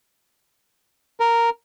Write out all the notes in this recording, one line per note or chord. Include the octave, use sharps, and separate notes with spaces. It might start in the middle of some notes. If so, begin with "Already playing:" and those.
A#4